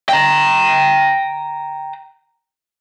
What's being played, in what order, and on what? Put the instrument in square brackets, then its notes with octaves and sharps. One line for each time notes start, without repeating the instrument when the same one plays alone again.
[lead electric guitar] G5 A#5